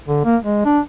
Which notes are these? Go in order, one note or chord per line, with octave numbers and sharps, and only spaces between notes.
D3
A#3
G#3
D4